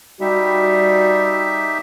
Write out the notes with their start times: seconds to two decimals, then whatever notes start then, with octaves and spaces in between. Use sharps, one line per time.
0.21 G3 D#4 F#4 G4 E5